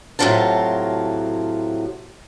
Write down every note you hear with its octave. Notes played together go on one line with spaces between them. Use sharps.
A2 C3 F3 F#3 F4 A5